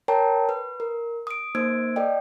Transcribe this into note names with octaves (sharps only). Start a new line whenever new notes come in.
A#4 C#5 G5 A5 A#5
B4
A#4
D#6 D7
A#3 D#4 C5 E6 G#6 D7
A4 D5 D#5 G5